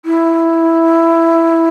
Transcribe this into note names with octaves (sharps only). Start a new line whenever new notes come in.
E4